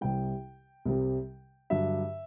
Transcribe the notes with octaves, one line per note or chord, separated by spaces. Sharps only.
C2 C3 G3 G5
C2 C3 G3
G2 D3 F#3 E5